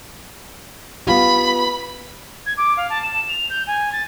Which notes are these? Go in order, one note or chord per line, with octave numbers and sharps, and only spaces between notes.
B3 F4 G4 B5
G#6
D6
F5
A5
E7
F7
G6
G#5
A6